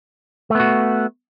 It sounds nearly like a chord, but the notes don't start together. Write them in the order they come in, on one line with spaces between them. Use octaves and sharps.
A3 B3 F#4